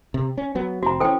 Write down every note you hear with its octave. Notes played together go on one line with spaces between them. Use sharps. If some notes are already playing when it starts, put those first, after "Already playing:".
C3
C#4
F#3 B3
F1 C4 F#4 A#5
E3 C#4 A4 C5 G5